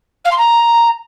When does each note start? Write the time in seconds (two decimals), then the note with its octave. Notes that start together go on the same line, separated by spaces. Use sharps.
0.24 F5
0.31 C6
0.38 A#5